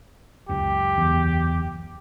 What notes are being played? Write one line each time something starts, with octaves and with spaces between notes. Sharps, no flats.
C#2 F#2 G4
E2